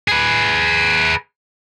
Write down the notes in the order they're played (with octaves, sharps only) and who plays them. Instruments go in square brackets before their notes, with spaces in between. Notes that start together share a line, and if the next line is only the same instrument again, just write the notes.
[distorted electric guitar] G#4 B4